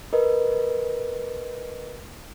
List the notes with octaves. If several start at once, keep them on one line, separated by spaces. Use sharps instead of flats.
A#4 B4 D#5